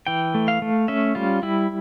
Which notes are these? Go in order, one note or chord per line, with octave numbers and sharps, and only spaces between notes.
E3 G5
A3
F5
A3
C#4 E5
G3 F4
G3 E4